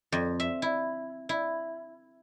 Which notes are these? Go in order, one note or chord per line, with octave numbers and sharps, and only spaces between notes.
F2
E5
E4
E4